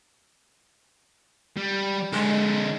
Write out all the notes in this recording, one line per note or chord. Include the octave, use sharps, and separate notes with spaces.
G3
D3 G#3 G#4